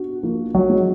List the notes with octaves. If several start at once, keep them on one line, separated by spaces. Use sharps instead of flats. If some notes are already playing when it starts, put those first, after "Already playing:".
Already playing: D4 F#4
F3 A#3
F#3
G#3